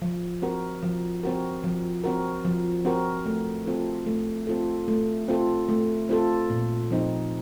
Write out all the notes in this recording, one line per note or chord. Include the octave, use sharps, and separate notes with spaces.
F3
C4 F#4 A#4
F3
C4 F#4 A#4
F3
C4 F#4 A#4
F3
C4 F#4 A#4
A3
C4 F4 A4
A3
C4 F4 A4
A3
C4 F4 A4
A3
C4 F4 A4
A#2
F3 C4 D#4